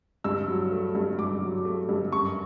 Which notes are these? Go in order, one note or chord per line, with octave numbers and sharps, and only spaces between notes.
G2 E6
F#3
A3
G2
G2 D6
F#3
A3
G2
F#2 C#6